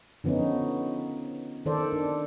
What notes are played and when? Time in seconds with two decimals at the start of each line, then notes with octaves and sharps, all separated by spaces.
0.24 D3 F3 B3 C#4 D#4
1.66 D#3 A4 C5 D5
1.92 D4